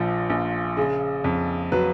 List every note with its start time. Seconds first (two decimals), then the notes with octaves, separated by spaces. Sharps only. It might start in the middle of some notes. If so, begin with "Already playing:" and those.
Already playing: A#1 A#2 F3
0.30 A#1
0.77 C#3
1.24 F2
1.72 F#3 B4